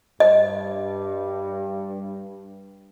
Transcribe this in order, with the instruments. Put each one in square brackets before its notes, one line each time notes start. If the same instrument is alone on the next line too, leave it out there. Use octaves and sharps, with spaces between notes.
[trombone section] G2 [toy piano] D#5